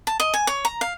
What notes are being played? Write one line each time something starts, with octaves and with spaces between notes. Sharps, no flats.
A5
D#5
G#5
C#5
A#5
F5